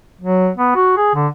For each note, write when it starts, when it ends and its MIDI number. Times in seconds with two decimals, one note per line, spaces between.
0.21 0.49 54
0.58 0.72 59
0.75 0.93 66
0.97 1.15 68
1.15 1.28 50